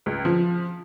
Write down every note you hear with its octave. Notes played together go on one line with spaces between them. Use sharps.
C#2
F3